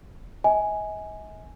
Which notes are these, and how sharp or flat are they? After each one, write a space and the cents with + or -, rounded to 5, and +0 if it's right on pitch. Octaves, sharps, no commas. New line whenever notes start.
D#5 +45 G#5 +0